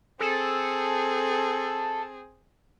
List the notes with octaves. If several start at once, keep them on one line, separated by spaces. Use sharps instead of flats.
C4 G#4 A4